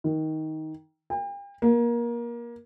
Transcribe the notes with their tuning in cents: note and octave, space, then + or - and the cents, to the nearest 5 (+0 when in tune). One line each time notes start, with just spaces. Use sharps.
D#3 +15
G5 +40
A#3 +25